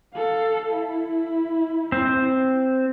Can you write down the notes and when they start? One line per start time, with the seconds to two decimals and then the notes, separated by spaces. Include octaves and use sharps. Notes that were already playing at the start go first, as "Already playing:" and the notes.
0.14 A4 F5
0.72 E4
1.92 C4